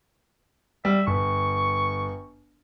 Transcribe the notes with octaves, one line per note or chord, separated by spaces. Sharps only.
G3 E5
G1 C#6